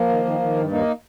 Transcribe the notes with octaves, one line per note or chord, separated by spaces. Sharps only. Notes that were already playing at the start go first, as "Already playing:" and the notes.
Already playing: F3 A#3
D#3
D#3
D#3
G2
D#2 A#3 D#4